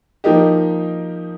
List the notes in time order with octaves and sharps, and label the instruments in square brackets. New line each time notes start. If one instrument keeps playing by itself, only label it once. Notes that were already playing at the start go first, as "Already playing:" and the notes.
[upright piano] F3 A#3 D#4 G4